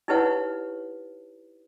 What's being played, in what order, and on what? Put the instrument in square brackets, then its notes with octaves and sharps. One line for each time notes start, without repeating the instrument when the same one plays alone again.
[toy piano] D#4 E4 G4 B4 C#5 F#5